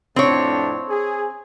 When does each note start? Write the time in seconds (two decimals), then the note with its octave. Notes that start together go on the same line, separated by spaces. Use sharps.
0.16 F2 A2 C4 D4 C#5
0.89 G#4